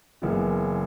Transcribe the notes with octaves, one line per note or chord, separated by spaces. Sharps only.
F#1 F#2 C#3 E3 G#3 B3